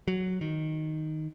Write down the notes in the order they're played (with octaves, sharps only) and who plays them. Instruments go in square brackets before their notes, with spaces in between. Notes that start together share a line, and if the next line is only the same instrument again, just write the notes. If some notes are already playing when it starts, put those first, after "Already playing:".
[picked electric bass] F#3
D#3